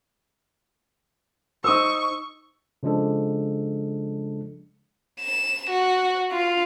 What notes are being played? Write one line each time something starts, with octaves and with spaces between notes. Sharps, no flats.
D#4 C5 C#6 D#6 E6
C#3 F3 G#3 D4 A4
E7
F#4
F4